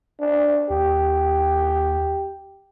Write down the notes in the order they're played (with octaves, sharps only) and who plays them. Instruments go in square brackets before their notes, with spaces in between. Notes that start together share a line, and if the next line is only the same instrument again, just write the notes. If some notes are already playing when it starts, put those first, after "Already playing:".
[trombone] D4
[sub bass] D#2 [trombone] G4